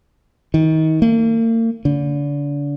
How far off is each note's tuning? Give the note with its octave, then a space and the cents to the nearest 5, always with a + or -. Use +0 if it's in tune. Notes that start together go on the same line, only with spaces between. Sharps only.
D#3 +30
A#3 -40
D3 -35